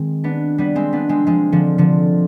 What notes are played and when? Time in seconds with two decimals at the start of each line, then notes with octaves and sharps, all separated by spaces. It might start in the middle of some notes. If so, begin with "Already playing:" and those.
Already playing: D#3 G#3 C4
0.24 B3 D4
0.58 G3 B3
0.75 G#3 C4
0.93 B3 D4
1.09 G#3 C4
1.27 F3 G#3
1.52 D3 F3
1.78 D3 F3